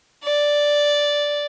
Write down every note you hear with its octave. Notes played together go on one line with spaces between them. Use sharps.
D5